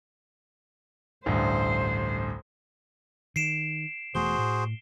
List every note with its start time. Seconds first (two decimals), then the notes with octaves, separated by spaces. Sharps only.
1.26 A1 D2 G2 C5
3.36 D#3 C7 D7 E7
4.15 E1 E2 A3 F#4 G#4 C5 G7
4.38 A2